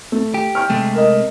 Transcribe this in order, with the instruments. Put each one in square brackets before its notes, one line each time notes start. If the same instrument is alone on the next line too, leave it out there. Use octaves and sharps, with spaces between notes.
[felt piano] A3
[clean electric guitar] G4
[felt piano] G5 C#6 F6
[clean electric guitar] C3 G#3 A3
[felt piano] A#4 D#5